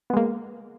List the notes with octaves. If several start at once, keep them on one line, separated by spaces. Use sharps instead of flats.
G#3 A#3 B3